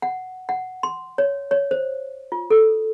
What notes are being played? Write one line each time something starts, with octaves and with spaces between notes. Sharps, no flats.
F#5
F#5
C6
C#5
C#5
C5
F4
A4